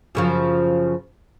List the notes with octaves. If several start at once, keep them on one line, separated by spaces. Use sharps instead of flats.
F#2 C#3 F3